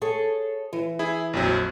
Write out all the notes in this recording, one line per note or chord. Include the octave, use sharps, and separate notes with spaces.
G#4 A4 C#5
E3
E4 G#4
A#1 F2 F#3